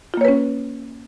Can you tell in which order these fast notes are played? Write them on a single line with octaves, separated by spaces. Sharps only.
F4 A#3 C#5 B4 C#4